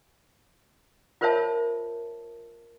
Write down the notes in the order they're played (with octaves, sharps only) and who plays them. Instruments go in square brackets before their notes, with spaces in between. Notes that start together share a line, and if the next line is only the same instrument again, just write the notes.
[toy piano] F4 A#4 C5 C#5 E5 A5